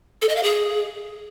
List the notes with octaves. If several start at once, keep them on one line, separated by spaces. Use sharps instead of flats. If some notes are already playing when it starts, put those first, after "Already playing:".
A4
D#5
F5
G#4